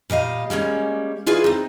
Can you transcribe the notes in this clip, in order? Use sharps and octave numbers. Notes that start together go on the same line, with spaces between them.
A#2 G3 D#5 F5
G3 G#3 A#3 C#4
E4 F4 G#4 B4 D5
C4 D#4